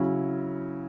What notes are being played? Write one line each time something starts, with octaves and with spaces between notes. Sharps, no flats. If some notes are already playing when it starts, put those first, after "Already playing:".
Already playing: C#3 F#3 C#4 E4